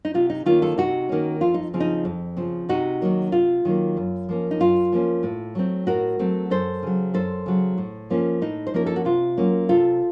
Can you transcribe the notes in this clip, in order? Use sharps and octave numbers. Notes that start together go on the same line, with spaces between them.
D#4
C3 F4
D#4
D#3 A#3 C#4 F4
F4 A4
C3 D#4 F#4
D#3 A#3 C#4
F2 F4
D#4
C#3 F3 C4
D#4
F2
C#3 F3 C4
C3 D#4 F#4
D#3 F#3 A#3
C3 F4
D#3 F#3 A#3
F#2
F3 A#3 C#4
D#4
F#2 F4
F3 A#3 C#4
A2
F#3 A3 C4
A2 F#4 A#4
F#3 A3 C4
F#2 A4 C5
C#3 F#3
F#2 A4 C5
C#3 F#3
A2
F3 A#3 C#4
A2 D#4
C5
F3 A#3 C#4 A#4
A4
F#4
C3 F4
F#3 A#3 C#4
C3 F4 A4